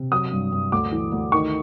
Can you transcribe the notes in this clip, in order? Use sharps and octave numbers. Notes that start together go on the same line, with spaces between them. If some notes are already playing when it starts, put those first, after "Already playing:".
Already playing: C3
F#3 D#6
G2
G2
D2 D6
E3
D2
D#3 C#6